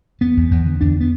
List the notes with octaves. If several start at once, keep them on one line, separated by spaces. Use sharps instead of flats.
E2 B3
E2
E2
D3
E2 D4
B3